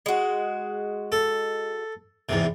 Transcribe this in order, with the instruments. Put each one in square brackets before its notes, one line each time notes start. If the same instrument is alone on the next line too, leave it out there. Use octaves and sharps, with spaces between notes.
[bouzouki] G#3 F#4
[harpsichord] A4
E2 G#2 C3